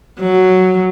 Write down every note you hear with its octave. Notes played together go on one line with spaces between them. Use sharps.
F#3